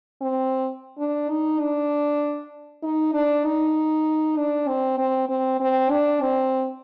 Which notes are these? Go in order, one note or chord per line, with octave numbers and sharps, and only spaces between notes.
C4
D4
D#4
D4
D#4
D4
D#4
D4
C4
C4
C4
C4
D4
C4